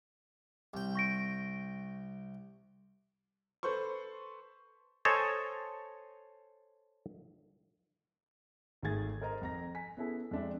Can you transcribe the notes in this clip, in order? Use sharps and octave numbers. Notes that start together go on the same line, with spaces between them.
C2 G5
C#6 A#6 D7
A4 B4 C5 C6 C#6
A4 C5 C#5 D#5 G#5 A5
G#1 D#3 A3 G#4 G#6 A6
A#4 C5 D#5 A#5
F2 A#5 A#6
G#5 B6
B3 C#4 E4 G#4 A4
F2 G#3 D4 E5